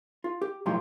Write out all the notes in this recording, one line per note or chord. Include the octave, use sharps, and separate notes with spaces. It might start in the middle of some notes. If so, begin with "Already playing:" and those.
F4
G4
B1 F#2 A2 F3 G4 C6